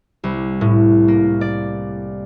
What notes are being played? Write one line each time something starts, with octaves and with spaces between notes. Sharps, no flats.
C2
A2
A#3
D5